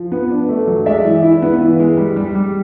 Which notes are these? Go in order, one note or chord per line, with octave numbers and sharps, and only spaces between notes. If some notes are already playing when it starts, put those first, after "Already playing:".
Already playing: F3
B3
D4
A3
F#3
G#3 D5 E5
E3
E4
B3
E3
G#3
G3
G3
G3